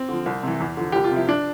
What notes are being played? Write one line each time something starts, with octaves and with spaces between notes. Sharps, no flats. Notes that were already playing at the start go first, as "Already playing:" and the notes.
Already playing: C4
D3 F3
C2
C3 E3
E2
D3 F3
C2 G4
F4
C3 F3 E4
D4